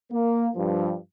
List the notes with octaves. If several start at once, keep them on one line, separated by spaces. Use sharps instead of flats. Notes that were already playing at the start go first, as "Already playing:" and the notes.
A#3
G2 F3